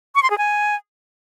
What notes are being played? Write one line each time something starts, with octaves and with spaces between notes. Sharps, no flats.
C#6
C6
G#4
G#5